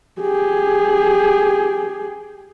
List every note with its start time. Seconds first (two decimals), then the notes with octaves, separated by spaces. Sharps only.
0.21 G4 G#4